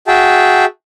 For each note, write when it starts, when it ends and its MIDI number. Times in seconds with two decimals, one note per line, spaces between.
0.08 0.65 66
0.08 0.65 68
0.08 0.65 76
0.08 0.65 79
0.08 0.65 81